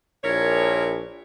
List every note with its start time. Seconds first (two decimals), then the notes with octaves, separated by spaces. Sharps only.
0.24 A#1 E4 A#4 C#5